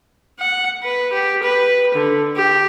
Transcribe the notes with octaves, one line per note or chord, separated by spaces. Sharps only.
F#5
B4
G4
B4
D3
G4